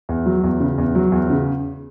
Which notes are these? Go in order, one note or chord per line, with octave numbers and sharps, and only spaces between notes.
E2
F#3
E2
C#3
E2
F#3
E2
C#3